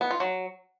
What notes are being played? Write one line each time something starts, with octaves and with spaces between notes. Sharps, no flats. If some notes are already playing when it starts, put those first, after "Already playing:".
B3
F4
F#3